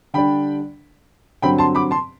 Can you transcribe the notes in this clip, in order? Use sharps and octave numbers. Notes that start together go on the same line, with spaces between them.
D3 G3 D4 G5 B5
G2 D3 F#3 C4 G5 B5
A5 C6
B5 D6
A5 C6